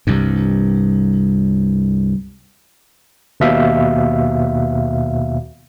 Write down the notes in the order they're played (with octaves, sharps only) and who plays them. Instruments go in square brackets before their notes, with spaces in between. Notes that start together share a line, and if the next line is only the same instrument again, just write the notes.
[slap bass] C2 G2
[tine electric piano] D#2 B2 E5 F5